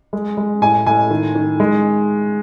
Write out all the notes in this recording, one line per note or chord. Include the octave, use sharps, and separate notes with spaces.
G#3
G#3
A2 G#5
A2 G#5
D#3
D#3
G#3